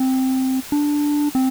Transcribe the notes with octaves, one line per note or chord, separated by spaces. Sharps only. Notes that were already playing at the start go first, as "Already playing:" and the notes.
Already playing: C4
D4
C4